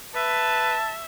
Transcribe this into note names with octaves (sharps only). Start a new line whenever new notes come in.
B4 E5 A5